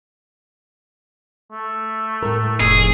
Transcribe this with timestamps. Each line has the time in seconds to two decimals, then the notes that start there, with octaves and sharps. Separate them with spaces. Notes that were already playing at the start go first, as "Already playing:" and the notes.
1.52 A3
2.23 A2 A#4
2.60 F1 G#4